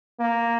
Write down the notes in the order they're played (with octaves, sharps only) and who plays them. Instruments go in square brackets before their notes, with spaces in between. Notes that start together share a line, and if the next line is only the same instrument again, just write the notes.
[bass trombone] A#3